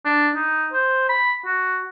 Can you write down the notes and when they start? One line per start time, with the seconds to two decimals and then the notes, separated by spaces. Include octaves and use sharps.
0.05 D4
0.36 D#4
0.73 C5
1.09 B5
1.46 F#4